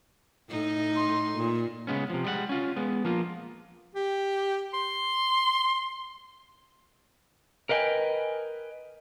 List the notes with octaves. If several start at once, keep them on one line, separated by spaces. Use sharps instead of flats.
A2 D#4
C6
A#2
C#3 G#3 B3 C#4
C3 F3
G3 G#3 D5 F#5
C#4 F4
G#3 B3
F3 A#3 F4
G4
C6
A#4 B4 D#5 F5 G5 G#5